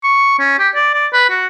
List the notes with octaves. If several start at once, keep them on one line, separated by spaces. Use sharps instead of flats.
C#6
C#4
G4
D5
D5
B4
F#4